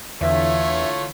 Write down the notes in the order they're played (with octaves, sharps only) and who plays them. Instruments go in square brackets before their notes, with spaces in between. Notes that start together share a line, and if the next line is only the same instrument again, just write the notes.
[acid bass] E2 [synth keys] D3 E3 B6 [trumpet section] A3 F4 C#5 [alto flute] E5